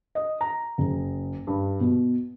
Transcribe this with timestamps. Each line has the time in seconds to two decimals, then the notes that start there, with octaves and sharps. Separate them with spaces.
0.15 D#5
0.41 A#5
0.78 F#1
1.47 G2
1.80 B2